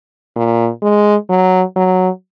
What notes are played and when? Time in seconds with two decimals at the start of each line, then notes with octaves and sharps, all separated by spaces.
0.36 A#2
0.83 G#3
1.30 F#3
1.76 F#3